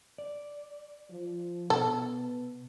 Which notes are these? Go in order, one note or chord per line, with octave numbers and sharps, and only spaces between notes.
D5
F3
B2 B3 A4